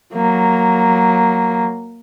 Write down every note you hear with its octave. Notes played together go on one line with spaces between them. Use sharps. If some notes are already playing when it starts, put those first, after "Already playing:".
F#3 A#3